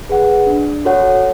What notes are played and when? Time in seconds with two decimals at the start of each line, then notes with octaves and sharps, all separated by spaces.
0.09 G#4 B4 F#5
0.47 D4
0.85 F#4 A4 C#5 F#5